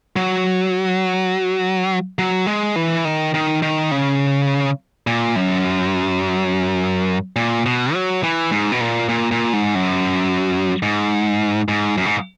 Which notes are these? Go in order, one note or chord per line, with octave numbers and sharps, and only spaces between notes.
F#3
F#3
G#3
E3
D#3
D#3
D#3
C#3
A#2
F#2
A#2
B2
F#3
E3
G#2
B2
A#2
A#2
A#2
G#2
F#2
G#2
G#2
F#2
G#2